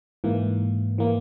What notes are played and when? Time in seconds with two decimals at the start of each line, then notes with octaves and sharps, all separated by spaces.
0.24 G#2 E3 A#3
0.98 E3 A#3